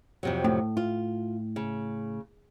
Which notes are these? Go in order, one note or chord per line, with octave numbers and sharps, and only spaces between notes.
F2 C3 F#3
A2
F4
C#3